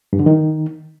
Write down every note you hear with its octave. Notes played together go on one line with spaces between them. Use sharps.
G2
D3
D#3